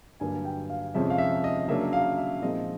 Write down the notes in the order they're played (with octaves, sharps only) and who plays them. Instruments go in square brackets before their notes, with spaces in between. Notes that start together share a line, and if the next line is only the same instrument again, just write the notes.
[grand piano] G2 D3 F#3 A#3 G#5
G5
F5
F2 C3 F3 G#3 C#4 E5
F5
E5
D#5
C#3 F#3 A#3 D4 E5
F5
E5
A#2 F3 G#3 C4 D#4 D#5